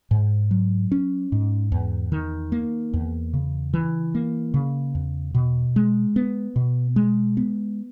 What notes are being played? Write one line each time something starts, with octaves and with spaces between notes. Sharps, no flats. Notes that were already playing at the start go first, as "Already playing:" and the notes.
G#2
F#3
C#4
G#2
E2
D#3
A#3
E2
C#3
E3
A#3
C#3
E2
B2
G#3
B3
B2
G#3
B3